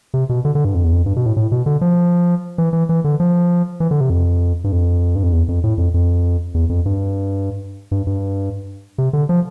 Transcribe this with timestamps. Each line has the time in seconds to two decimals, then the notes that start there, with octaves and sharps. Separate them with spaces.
0.14 C3
0.29 B2
0.45 D3
0.55 D3
0.65 G2
0.75 F2
0.84 E2
0.93 F2
1.06 G2
1.16 B2
1.26 A2
1.37 A2
1.52 B2
1.66 D3
1.81 F3
2.58 E3
2.73 E3
2.89 E3
3.04 D3
3.20 F3
3.80 E3
3.91 D3
4.01 C3
4.10 F2
4.64 G2
4.72 F2
5.16 G2
5.23 F2
5.32 E2
5.48 F2
5.64 A2
5.78 F2
5.94 F2
6.54 E2
6.69 F2
6.86 G2
7.91 G2
8.07 G2
8.98 C3
9.13 D3
9.29 F3